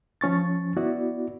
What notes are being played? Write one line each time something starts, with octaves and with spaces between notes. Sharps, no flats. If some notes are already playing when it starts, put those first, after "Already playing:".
F3 C#4 C#6 A6
B3 E4 F#4 D5